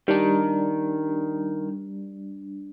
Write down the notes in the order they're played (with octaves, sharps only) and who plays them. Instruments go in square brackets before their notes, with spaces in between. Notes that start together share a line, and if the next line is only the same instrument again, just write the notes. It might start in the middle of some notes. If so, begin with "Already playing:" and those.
[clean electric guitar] D#3 [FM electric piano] G3 D4